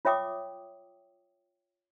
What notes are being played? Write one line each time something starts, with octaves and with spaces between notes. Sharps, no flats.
F4 C#5 E5 G5 D6 D#6